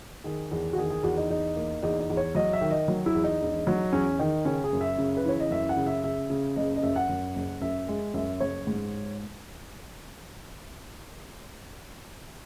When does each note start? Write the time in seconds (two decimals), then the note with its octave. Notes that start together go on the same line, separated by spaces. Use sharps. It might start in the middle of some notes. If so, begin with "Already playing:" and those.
0.24 D#3 G#4
0.51 E2
0.73 F#4
0.77 D#3 G#4
0.90 G#4
1.03 E2 F#4
1.17 D#4
1.30 E2 D#4
1.56 A#3
1.83 E2 D#4
2.00 D#4
2.10 E2
2.17 C#5
2.35 F#3 D#5
2.53 E5
2.61 D#3
2.71 D#5
2.88 F#3
3.06 E4
3.15 E2
3.24 D#4
3.41 E1
3.67 F#3
3.93 E2 C#4
4.19 D#3 D#4
4.45 C#3 C#4
4.64 G#4
4.73 F#2
4.81 E5
4.98 C#3
5.17 B4
5.25 E3 C#5
5.40 D#5
5.51 F#2 E5
5.69 F#5
5.77 C#3
5.86 E5
6.04 C#3 E5
6.30 C#3
6.56 F#1 D#5
6.76 D#5
6.83 F#2 E5
6.96 F#5
7.09 F#2
7.36 F#1
7.61 F#2 E5
7.88 G#3
8.14 F#2 E5
8.40 F#1 C#5
8.67 G#2